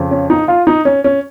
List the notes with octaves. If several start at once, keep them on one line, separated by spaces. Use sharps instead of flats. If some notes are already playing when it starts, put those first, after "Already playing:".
Already playing: F2 C#3 F3
C#4
D#4
F4
D#4
C#4
C#4